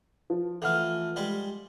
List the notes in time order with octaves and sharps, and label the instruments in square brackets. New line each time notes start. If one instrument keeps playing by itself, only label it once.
[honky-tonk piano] F3
[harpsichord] E3 A3 [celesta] A4 F#5 F6
[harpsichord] G3 G#3 G4